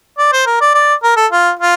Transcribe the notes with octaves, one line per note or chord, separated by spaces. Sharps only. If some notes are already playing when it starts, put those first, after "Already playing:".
D5
C5
A#4
D5
D5
A#4
A4
F4
F4